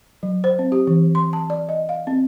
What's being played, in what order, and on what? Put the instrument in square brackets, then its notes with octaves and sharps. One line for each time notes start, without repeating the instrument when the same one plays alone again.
[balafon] F#3
C5
C4
G4
E3
C6
A5
D5
D#5
F5
C4